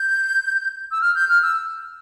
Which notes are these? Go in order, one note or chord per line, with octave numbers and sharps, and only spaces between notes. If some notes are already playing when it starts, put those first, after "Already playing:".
Already playing: G6
E6
F6
G6
F6
E6